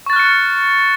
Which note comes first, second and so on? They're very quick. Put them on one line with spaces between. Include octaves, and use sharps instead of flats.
C#6 A6 F#6 F6 C#7